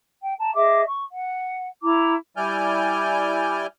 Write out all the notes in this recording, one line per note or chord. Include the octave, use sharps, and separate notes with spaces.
G5
A5 A#5
G#4 D#5 E5 D6
C#6
F#5
E4 A#5 D6
G3 E4 D5 G#5 F6 G6